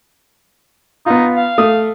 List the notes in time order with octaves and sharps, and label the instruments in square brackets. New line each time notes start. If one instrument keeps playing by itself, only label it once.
[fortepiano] B3 F4 [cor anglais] D#4
[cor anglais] F5
[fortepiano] A3 D#6